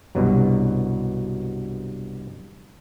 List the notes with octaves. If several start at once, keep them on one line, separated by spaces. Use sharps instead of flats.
C2 G2 B2 F#3